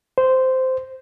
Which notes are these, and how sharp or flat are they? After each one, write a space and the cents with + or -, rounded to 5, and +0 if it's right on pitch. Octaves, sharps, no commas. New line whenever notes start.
C5 -10